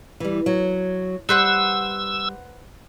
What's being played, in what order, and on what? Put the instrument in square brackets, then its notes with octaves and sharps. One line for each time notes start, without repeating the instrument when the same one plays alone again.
[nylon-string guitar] E3 G3
F#3
[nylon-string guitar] G3 [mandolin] B4 C5 F#5 [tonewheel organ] E6